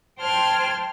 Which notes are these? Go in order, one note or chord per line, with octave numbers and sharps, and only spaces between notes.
C5 G5 A5 C6 F6 G#6